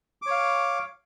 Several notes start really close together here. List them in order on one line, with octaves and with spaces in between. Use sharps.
D6 C#5 F5